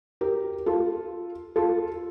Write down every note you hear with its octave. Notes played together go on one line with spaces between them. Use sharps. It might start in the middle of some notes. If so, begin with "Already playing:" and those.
G4 A#4
F4 A4
F4 A4